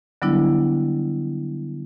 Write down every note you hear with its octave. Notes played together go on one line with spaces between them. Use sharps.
D3 F#3 G3 B3 D4 E4